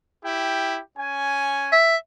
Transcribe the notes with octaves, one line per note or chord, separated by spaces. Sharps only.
E4 G4 G5
C#4 G#5
E5